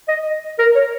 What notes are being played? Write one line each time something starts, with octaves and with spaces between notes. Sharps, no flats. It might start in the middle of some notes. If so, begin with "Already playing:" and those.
D#5
A#4
C#5